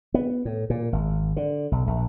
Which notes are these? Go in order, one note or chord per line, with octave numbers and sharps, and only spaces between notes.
B3
A2
A#2
G#1
D3
B1
A#1